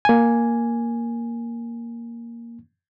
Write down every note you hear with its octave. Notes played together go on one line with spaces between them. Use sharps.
A#3 G#5